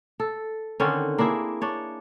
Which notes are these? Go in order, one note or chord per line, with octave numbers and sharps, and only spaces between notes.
A4
D3 D#3 C4 C#4
A#3 D4 E4 G#4
D4 C#5